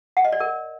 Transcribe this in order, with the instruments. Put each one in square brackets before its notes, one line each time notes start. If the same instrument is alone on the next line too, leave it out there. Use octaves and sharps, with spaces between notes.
[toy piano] F#5
D#5
D5
A#4